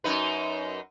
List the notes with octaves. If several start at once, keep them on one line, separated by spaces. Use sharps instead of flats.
F#2 D#4 B4